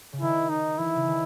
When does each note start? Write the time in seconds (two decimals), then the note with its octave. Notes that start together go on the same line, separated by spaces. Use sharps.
0.13 C#3
0.21 D#3 E4
0.49 D#4
0.78 E3 E4
0.96 C#3
1.07 D#3